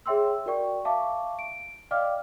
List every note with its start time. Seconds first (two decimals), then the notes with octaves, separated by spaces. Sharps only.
0.06 G#4 C#5 E5 G5 C6 E6
0.46 F#4 A#4 D5 G5 C#6
0.85 E5 F5 A5 C#6 D6
1.39 D7
1.91 D5 D#5 F5 G5 D6 F6